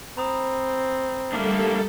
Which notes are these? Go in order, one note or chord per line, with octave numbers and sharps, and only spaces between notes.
C4 A#5 B5 D#6
G3 A3 A#3 D4 A4